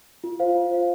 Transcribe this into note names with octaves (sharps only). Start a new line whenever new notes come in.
F4
C5 F5
F4
C5 F5